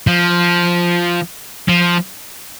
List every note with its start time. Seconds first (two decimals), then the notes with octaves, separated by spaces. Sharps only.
0.07 F3
1.68 F3